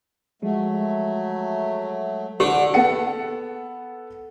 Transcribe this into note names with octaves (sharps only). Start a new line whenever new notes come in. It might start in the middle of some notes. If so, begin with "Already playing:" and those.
F3 F#3 G#3 A3
D3 G4
B3 A4 F#5 C#7